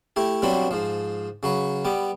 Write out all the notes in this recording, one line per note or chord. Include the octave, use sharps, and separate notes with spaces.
A3 E4 G4
G2 B2 F#3 C4 D4 B5
G#2 F3
C#3 F#3 B4
G3 B3 D6